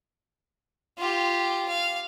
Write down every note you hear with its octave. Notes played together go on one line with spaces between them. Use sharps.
F4 G4
F5